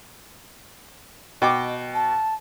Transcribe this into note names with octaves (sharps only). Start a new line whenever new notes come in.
B2 D#5 G5 D6
A5